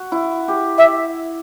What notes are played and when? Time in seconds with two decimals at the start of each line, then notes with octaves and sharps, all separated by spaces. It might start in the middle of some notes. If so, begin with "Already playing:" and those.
Already playing: F#4
0.12 E4
0.48 G4
0.78 E5